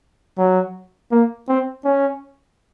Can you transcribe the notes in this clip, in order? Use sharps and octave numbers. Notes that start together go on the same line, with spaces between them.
F#3
A#3
C4
C#4